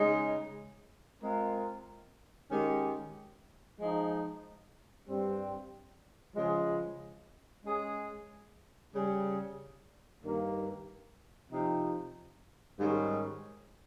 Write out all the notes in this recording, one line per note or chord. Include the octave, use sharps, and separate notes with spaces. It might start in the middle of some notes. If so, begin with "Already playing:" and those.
Already playing: C#3 G#3 D#4 G#4
G#3 C4 F4 A#4
D#3 G#3 C#4 G4
F3 G#3 D#4
G2 G3 C4
C#3 F3 G#3
G#3 C#4 G#4
C#3 G3 C#4 G#4
G2 D#3 A#3
C3 F3 C4 D#4
G#2 D#3 G3 C#4